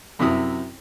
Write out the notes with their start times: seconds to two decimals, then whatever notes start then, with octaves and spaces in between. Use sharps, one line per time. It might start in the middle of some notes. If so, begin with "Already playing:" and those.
0.19 F#2 C3 E4 D#6